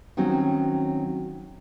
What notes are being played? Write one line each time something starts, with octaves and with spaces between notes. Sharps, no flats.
D#3 F#3 C4 C#4 F#4